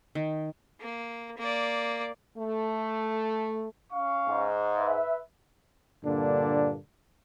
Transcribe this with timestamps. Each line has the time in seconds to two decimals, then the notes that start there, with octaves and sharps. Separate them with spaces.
0.15 D#3
0.80 A#3
1.37 A#3 D5
2.36 A3
3.92 C#4 F5 C#6
4.28 G#2
4.77 B4 E5
6.05 G2 A#2 D3 A#3 D4